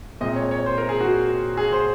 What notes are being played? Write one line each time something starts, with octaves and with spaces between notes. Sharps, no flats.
A#2 G#3 C4 D#5
C#5
C#5
C5
A#4
G#4
F#4
G#4
C5